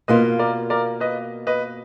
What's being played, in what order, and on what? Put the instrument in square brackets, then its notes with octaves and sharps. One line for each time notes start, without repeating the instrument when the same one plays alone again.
[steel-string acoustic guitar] B2 A#3 F4 [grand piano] B4 D#5
[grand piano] A#4 D5
A#4 D5
B4 D#5
B4 D#5